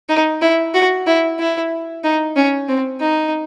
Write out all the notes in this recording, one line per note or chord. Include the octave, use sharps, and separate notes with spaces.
D#4
E4
F#4
E4
E4
D#4
C#4
C4
D#4